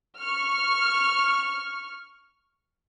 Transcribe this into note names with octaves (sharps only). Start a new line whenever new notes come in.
C#6 F6